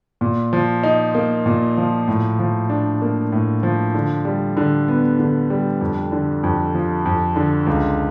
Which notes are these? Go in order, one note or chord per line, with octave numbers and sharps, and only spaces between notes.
A#2
F3
D#4
A#3
A#2
F3
A2
F3
D4
A#3
A2
F3
D3
G3
D3
B3
D3
G3
F2
D3
F2
F3
F2
D3
C#2